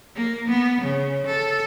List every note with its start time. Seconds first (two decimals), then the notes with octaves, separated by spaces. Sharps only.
0.16 A#3
0.49 B3
0.82 C#3
1.27 A4